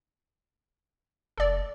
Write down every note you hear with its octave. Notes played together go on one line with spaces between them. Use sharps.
F1 A4 D5